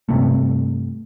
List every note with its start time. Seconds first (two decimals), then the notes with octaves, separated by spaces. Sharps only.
0.09 G2 C3 A3